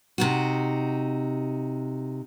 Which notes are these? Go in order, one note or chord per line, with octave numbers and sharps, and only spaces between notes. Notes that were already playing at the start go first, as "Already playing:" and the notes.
C3 D#4 F#4